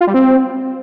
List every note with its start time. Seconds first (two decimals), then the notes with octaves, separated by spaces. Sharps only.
0.01 F4
0.07 G3
0.14 C4